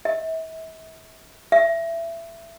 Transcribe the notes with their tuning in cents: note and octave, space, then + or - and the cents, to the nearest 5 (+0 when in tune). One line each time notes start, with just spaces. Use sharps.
E5 -40
E5 +20